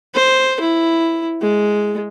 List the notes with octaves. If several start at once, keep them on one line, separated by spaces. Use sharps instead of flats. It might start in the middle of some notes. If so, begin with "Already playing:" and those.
C5
E4
G#3